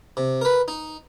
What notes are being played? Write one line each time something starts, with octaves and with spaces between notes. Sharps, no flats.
C3
A#4 B4
D#4